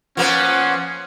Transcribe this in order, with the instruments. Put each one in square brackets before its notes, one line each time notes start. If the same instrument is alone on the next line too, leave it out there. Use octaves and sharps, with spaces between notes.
[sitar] F3 A#3 B3 [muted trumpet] C#4 [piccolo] F#5